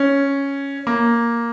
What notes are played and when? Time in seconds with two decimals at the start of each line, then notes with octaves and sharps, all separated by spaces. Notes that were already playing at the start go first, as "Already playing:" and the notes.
Already playing: C#4
0.87 A#3